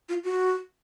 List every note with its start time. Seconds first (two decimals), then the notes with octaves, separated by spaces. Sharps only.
0.09 F4
0.24 F#4